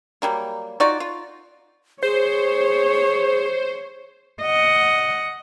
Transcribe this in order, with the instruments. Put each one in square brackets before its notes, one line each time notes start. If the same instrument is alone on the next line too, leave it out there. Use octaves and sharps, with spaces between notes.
[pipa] F#3 G3 A#3
D#4 F4 F#4 D5
F4
[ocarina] G#4 [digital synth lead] C5 [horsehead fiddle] C#5
[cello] D#5 F#5